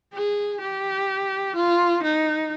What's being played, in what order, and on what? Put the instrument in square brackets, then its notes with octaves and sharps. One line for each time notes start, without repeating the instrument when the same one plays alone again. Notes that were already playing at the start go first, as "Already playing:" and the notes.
[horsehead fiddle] G#4
G4
F4
D#4